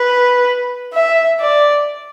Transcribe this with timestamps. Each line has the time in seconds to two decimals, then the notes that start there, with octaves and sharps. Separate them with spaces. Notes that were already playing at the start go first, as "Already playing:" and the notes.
Already playing: B4
0.94 E5
1.40 D5